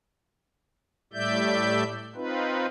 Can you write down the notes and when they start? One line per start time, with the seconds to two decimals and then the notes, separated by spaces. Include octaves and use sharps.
1.13 A2 G3 A3 D5 E5 G6
2.15 C4 D#4 F4 B4